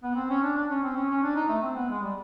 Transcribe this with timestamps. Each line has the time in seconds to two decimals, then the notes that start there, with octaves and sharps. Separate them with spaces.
0.03 B3
0.16 C4
0.30 C#4
0.43 D4
0.56 D4
0.70 C#4
0.83 C4
0.96 C#4
1.09 C#4
1.23 D4
1.36 D#4
1.48 A3
1.62 C4
1.76 B3
1.89 G#3
2.02 G3